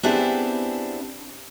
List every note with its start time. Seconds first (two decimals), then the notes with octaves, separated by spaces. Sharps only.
0.03 B3 C4 D4 E4 G4 G#4